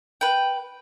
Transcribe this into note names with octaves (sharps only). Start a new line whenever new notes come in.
B4 G5